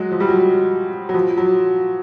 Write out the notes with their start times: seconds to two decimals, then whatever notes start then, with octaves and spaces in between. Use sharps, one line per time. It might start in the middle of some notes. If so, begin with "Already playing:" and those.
Already playing: F#3 G#3
0.12 F3
0.20 G3
0.29 F#3
1.09 F#3
1.14 F3
1.37 F#3